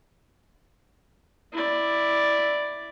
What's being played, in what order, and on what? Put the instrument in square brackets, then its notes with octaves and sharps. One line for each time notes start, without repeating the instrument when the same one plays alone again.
[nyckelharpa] E4 D5